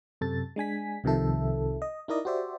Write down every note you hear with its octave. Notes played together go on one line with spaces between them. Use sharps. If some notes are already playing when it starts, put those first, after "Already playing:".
F#2 C3 A4 A6
G#3 D4 G#5 B6
C2 C3 D#3 F3 A4 E5
D#5
D#4 E4 A#4 D5 D#5
F#4 G4 C5 D5 E5